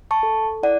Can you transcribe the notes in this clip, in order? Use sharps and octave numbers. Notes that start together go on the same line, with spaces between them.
A5 C#6
A4
E4 D5 F#5